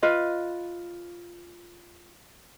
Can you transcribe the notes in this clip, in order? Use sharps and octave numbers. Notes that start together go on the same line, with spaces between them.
F4 B4 D#5